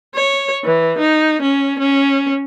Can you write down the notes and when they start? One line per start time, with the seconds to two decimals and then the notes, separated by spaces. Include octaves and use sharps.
0.15 C#5
0.64 E3
0.99 D#4
1.42 C#4
1.79 C#4